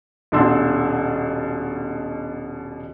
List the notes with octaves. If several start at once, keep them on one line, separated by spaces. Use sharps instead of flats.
D#1 B2 D4 C6 E6